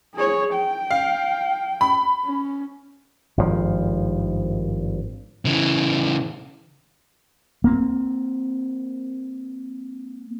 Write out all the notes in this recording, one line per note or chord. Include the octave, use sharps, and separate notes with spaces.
G#4 C#5
G5
F5
B5
C#4
G#1 G2 B2 F3
C#3 E3
A#3 C4